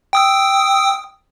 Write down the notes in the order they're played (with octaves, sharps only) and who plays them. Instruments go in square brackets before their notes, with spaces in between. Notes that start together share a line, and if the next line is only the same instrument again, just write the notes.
[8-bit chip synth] G5 D#6 E6